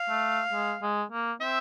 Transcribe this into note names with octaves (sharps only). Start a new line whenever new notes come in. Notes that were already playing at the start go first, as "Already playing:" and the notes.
Already playing: F5
A3
G#3
G#3
A#3
C4 E5